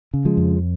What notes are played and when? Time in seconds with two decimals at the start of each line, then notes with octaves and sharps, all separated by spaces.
0.14 C#3
0.25 F3 G#3
0.37 F2